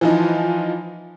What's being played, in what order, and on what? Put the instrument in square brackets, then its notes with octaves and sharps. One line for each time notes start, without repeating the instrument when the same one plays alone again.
[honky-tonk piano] E3 F3 D#4